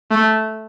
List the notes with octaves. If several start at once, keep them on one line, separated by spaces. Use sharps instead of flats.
A3